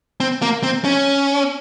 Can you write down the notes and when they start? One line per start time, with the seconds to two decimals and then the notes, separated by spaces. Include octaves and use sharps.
0.20 C4
0.42 A#3
0.63 C4
0.84 C#4